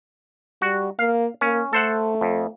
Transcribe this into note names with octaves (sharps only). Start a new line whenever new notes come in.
G3 F#4
A#3 F5
A#3 C#4
A3 A4 C5 F#5
F2